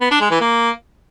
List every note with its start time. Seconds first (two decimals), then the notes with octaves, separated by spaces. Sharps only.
0.01 B3
0.11 D4
0.21 G#3
0.31 E3
0.41 A#3